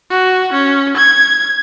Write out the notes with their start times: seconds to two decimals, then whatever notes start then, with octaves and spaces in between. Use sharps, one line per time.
0.11 F#4
0.52 C#4
0.97 G#6